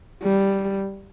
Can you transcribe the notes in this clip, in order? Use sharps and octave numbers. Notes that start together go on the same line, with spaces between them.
G3